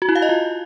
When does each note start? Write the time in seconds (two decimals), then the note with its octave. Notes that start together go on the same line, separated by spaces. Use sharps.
0.02 F#4
0.09 E4
0.15 F5
0.22 D#5
0.29 F4